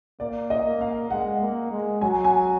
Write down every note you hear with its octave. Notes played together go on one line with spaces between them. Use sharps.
A#3 D5
D#5
A#3
F5
G#3 F#5
A#3
G#3
F#3 G#5
G#5